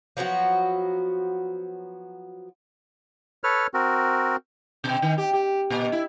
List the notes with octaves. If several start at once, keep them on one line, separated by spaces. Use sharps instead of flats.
F3 F#3 B3 F#4
A4 B4 C#5 F6
C4 F#4 A#4
B2
D#3
G4
G4
A#2
E4